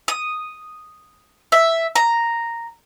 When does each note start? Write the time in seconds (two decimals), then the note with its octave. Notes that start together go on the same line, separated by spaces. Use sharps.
0.08 D#6
1.52 E5
1.96 A#5